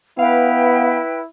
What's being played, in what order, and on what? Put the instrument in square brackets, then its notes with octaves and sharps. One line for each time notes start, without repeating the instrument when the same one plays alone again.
[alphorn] B3 [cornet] E4 [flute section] B4 G5 [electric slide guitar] F5